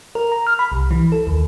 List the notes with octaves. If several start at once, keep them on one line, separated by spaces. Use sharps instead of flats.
A#4
A#5
F6
B5
C2
E3
A4
D#2